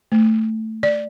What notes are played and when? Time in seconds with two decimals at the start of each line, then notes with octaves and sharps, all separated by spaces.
0.12 A3
0.83 D5